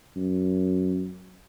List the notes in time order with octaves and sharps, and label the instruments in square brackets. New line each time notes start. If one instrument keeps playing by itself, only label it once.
[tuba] F#2